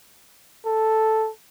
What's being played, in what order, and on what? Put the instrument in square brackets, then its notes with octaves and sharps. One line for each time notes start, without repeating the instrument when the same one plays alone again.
[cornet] A4